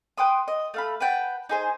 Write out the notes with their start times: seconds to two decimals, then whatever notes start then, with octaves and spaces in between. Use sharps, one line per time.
0.18 B4 G5 C6 D#6
0.48 D#5
0.74 A3 F5 B5
1.00 B4 F#5 G5 A5
1.49 D#4 G#4 C5